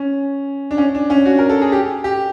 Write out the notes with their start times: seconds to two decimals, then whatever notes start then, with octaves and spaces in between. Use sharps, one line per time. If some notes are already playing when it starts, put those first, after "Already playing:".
Already playing: C#4
0.71 D4
0.78 C#4
0.95 D4
1.10 C#4
1.26 F#4
1.39 A#4
1.49 A4
1.61 G#4
1.72 G4
2.04 G4